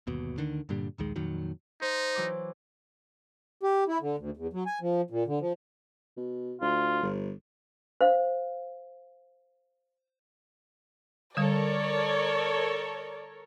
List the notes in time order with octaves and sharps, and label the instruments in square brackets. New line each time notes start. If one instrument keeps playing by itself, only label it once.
[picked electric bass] G1 D#2 B2
D2 D3 D#3
G2 A#2 D3 G3
A#1 D#2 D#3 G#3
F2 A#2 D#3 F#3
[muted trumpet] D#4 [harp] C5
[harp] E3 F#3 D6
[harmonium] G4
E4
D3
D2
E2
F#3
G#5
F3
A#2
D3
F3
[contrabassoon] B2
[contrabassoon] D2 [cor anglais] F4
[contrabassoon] G1
[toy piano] C5 F5
[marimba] D3 G3 [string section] A4 A#4 C#5 [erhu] D5